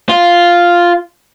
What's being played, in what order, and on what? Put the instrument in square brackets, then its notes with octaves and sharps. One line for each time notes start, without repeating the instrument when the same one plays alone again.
[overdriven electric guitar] F4